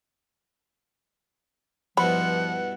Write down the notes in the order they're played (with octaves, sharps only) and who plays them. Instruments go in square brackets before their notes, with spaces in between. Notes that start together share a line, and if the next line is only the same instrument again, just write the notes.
[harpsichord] G2 B2 E4 [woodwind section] F3 [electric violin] F#5 [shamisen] B5